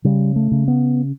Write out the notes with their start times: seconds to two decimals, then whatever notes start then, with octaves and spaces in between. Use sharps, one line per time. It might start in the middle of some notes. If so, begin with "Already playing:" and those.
0.04 C#3 G3
0.36 A3
0.51 C#3
0.68 B3